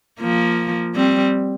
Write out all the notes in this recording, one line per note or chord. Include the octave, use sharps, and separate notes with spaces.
F3 A#3
G3 C4